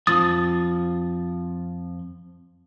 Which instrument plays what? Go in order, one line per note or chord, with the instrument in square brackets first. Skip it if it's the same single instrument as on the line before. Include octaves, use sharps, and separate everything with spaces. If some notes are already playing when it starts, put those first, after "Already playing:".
[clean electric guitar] F2 F3 [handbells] D#6 A6